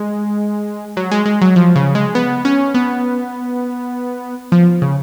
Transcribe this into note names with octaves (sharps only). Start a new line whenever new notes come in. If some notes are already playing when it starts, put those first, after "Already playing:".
Already playing: G#3
F#3
G#3
G#3
F#3
F3
C#3
G#3
B3
C#4
B3
F3
C#3